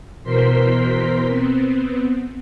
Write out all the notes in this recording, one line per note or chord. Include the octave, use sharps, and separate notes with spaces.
B2 E3 A#4 C5 C6 B6
B3 C4